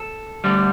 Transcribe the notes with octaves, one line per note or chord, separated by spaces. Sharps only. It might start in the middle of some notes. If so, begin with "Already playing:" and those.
Already playing: A4
D2 D3 G3